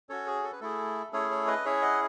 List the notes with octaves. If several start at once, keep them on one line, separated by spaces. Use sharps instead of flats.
C#4 F#4 A4 C#5
G#4
A4
B4
A3 E4 G#4 A4
A3 C#4 E4 G#4 A4 C#5
A4 C#5
B4 D#5
C#4 E4 G#4 C#5 E5
D#5 F#5